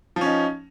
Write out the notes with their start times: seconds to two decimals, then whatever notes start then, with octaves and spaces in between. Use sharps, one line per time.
0.16 F3
0.21 C#4
0.26 D#4